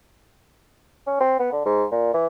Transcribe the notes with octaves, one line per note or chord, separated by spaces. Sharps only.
C#4
C4
B3
D3
G#2
A#2
E3